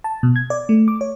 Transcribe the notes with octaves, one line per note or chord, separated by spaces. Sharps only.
A5
B2
G#6
D5
A3
D6
C#5